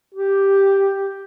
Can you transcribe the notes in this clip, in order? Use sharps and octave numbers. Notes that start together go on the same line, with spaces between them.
G4